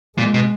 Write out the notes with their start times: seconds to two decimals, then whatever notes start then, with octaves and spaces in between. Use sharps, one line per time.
0.17 A#2 G#3
0.34 B2